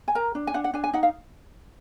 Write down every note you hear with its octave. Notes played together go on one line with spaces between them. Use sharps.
G#5
A#4 A#5
D4
G#5
D4 F#5
F#5
D4 G#5
G#5
D#4 F#5
F5